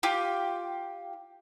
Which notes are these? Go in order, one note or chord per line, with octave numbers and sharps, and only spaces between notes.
F4 G4